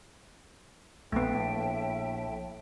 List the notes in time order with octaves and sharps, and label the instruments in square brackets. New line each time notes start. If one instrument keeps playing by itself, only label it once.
[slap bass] A#1 [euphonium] A2 [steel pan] A3 B3 [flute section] E5 G5 A5